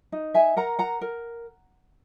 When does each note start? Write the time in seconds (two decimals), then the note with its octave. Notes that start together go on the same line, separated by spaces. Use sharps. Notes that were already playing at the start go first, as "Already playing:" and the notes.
0.12 D#4
0.34 E5 G#5
0.56 A#4 F#5 A#5
0.79 F#5 A#5
1.01 A#4